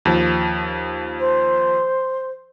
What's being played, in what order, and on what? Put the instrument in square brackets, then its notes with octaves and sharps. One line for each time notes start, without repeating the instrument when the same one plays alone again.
[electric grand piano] D#2 F3
[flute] C5